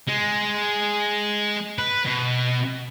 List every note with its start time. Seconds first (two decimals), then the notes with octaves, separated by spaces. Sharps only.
0.07 G#3
1.78 B4
2.05 B2